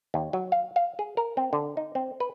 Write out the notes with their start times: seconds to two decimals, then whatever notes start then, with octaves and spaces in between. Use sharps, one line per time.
0.14 D#2
0.33 F#3
0.52 F5
0.76 F5
0.99 G#4
1.17 A#4
1.37 C4
1.53 D3
1.77 D#4
1.95 C4
2.20 B4